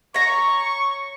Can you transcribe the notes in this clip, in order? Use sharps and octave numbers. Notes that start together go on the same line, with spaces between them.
C#5 A#5 C#6